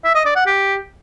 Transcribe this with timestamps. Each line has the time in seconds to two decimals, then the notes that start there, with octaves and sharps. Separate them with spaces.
0.04 E5
0.15 D#5
0.25 D5
0.36 F#5
0.46 G4